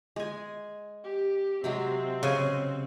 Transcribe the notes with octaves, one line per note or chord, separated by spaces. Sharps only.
G#3 G#5
G4
C3 F#3 G#3 C4
C#3 G#5